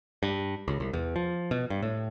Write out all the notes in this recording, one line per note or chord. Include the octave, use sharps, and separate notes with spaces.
G2
C#2
C2
E2
F3
B2
G2
A2